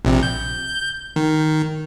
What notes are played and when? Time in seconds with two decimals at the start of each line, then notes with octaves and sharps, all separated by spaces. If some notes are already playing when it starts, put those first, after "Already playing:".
0.05 A#1 C3
0.23 G6
1.16 D#3